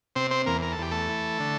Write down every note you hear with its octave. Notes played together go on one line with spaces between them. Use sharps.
C3 C4 C5
C4 C5
E2 A#3 A#4
A#4
A4
E2 G4
A3 A4
E3
D3